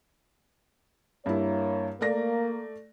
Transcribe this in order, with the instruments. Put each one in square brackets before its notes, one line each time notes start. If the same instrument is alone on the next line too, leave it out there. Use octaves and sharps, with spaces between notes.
[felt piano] G2 E4 [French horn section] A#3 C#5
[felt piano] A3 D5 A#6 [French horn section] A#3